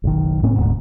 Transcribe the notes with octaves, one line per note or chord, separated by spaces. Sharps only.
F#1 B1 D#3
A2 A#3 C4 C#4
E1 D2 G#2 B2